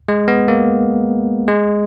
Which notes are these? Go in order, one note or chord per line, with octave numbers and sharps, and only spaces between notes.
G#3
B3
A#3
G#3